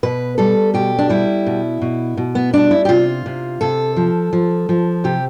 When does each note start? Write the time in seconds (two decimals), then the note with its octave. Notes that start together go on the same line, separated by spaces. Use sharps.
0.03 B2 B4
0.38 G3 A4
0.74 B2 G4
0.99 D4
1.09 G3 E4
1.46 B2
1.82 B2
2.17 B2
2.35 B3
2.53 G3 D4
2.71 E4
2.85 G4
2.89 C3 F4
3.26 C3
3.61 C3 A4
3.97 F3
4.33 F3
4.69 F3
5.04 C3 G4